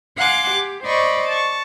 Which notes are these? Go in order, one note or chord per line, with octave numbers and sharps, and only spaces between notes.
F5 F#5 G#5 C6 D6 F#6
G4
C5 D5 D#5 B5 C#6 D6
A5 C#6